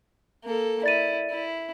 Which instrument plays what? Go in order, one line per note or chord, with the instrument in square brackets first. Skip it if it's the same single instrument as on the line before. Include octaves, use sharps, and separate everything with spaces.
[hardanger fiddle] A#3 A4
[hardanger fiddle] E4 [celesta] D5 A6 D#7
[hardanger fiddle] E4